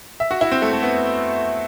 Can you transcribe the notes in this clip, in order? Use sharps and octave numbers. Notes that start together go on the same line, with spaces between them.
E5
F#4
E4
C4
A3
A3
B3